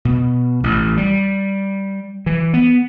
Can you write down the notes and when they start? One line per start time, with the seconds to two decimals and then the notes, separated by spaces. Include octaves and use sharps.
0.05 B2
0.64 A1
0.97 G3
2.26 E3
2.54 B3